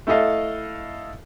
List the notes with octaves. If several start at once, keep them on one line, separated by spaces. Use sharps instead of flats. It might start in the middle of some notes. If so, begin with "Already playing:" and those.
A3 E4 A4 D#5 F5